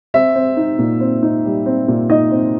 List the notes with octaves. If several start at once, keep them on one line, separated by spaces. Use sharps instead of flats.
C4 E5
C4
D#4
A#2
C4
D#4
G3
C4
A#2
D#4 D#5
C4